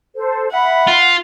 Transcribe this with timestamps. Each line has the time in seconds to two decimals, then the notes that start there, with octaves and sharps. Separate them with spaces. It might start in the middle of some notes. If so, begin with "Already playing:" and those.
0.15 A4 C5
0.52 E5 F#5 B5
0.87 F4